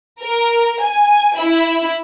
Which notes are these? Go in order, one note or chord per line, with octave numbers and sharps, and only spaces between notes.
A#4
G#5
E4